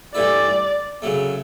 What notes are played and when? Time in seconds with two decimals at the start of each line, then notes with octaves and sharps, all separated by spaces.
0.14 G2 E3 A3 E4 D5
1.02 C#3 F#3 A3